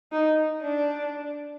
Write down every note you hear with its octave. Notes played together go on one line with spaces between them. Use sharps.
D#4
D4